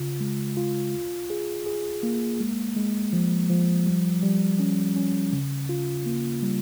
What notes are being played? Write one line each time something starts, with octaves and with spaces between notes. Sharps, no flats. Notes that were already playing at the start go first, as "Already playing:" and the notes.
Already playing: C#3 F4
G#3
F4
F4
G#4
G#4
A#3
G#3
G#3
F3
F3
G3
G3
C#4
C#4
C#3
F4
A#3
G3